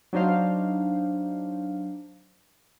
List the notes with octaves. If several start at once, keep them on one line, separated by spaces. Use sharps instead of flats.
F#3 D4 D#4 C5 F5